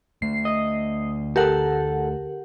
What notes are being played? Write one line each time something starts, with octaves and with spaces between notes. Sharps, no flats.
D2 A3 C7
D#5
G4 A4 A#4 F#5